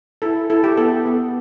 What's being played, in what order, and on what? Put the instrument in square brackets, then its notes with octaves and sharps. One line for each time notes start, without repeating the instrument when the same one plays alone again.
[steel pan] E4 A4
E4 A4
G4
B3 A4
B3